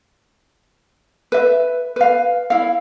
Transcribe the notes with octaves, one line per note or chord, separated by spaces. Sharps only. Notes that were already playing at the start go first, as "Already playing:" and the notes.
B4 E5
B4 F5
E4 F5